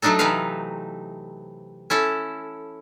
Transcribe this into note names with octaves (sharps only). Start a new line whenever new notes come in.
F#3 A3 D4 D#4 A4
C3 E3 F#3 D#4 B4 F5
C#4 E4 A4